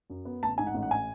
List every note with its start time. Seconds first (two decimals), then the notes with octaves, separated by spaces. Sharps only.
0.10 F#2
0.25 B3
0.43 A1 A5
0.58 G#2 G#5
0.67 F#5
0.74 A1
0.83 F#5
0.91 G#5